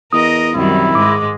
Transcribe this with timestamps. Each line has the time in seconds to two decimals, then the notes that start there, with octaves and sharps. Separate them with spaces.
0.13 E2 A#4 D#5 D#6
0.55 C2 F#2 D#3 G3 E4
0.95 G#2 G#3 D6